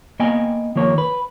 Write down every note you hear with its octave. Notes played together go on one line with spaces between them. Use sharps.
A#3 B3 D#5 G5 G#5
D#3 F3 A#3 C#5
B4